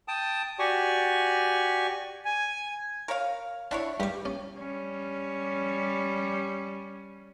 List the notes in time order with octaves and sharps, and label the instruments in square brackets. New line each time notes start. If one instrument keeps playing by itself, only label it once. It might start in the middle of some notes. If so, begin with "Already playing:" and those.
[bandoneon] G5 A5 D#6
F#4 G4 D5 G#5 C#6
[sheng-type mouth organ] G#5
[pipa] A#4 C#5 F5
[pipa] D4 E4 C#5 [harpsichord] F#5
[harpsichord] G2 [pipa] G3 G4
[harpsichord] C#4
[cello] G3 C#4